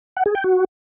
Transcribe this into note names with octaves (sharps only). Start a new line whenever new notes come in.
F#5
G#4
G5
F#4